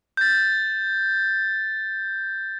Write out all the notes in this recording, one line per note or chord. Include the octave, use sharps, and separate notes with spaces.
G6 A6